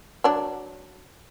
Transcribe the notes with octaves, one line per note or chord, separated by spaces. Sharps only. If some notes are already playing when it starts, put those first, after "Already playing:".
F#3 D4